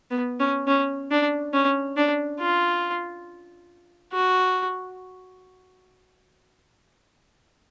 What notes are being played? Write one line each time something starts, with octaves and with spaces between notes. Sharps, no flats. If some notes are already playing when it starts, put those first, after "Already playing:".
B3
C#4
C#4
D4
C#4
D4
F4
F#4